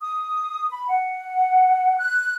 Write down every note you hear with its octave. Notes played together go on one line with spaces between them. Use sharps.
D#6
B5
F#5
F#6